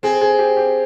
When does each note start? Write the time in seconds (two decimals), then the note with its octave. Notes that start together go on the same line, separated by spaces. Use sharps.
0.03 C4 G#4
0.21 G#4
0.39 G4
0.57 G4